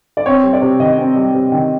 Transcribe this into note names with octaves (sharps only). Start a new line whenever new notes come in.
D5
C4 C#5
G3
D5
C3
D#3 D#5
C4
G3
C3
D#3